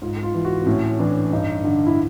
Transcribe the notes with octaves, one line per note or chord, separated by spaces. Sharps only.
G#2 F4
F4
E3
F#4
C4
A2 C#4
E3 D4
G2 D#4
D3
E4